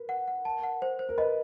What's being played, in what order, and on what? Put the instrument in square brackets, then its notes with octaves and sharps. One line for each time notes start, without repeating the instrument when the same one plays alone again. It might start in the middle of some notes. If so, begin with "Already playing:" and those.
Already playing: [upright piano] A#4 B4
[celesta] F#5
F#5
A5
F#5
C5
C5
[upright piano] A#4
[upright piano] B4 [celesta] D#5